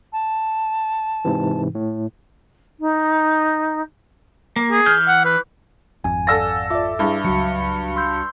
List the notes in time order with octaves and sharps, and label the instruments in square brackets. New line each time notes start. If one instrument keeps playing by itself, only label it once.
[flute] A5
[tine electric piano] G#2 C3 E3
A2
[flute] D#4
[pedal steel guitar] A#3
[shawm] G#4
[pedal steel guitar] E3 F6 G6
[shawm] F#5
B4
[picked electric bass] G#1 F2 [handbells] G#5
[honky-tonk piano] A4 E6 A#6 [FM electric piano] D5 F5 F#5
[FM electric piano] F4 D5 [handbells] E5 D6
[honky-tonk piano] G2 [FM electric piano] E4 G#4
[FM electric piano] C#2 F#4 C#7 [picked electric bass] F#3
[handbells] C6 E6 G6